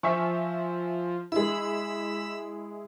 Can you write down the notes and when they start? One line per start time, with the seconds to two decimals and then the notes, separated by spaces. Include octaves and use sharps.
0.03 F3 E5 G#5 C#6
1.32 G#3 E4 B5 E6